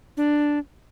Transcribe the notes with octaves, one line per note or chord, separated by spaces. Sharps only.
D4